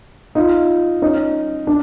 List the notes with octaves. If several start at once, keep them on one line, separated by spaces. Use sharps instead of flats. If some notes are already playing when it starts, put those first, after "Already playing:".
D#4 F4
C#4 D#4
D4